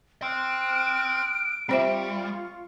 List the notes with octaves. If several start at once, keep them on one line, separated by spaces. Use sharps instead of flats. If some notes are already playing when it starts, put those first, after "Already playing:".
G5 C6 D#6 F6 F#6 D7
G3 C4 F4 C5 E5 C#6